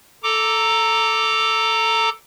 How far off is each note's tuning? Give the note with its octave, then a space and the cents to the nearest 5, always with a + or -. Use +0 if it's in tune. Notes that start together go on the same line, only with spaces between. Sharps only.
A4 +0 A#5 -15 D6 +0